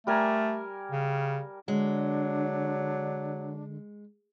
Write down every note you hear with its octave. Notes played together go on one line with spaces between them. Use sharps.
G3 A3 A#4 G#5
C#3
D3 F#3 G#3 D4